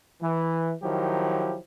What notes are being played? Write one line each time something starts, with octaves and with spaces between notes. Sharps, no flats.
E3
D#3 F3 F#3 E4 G4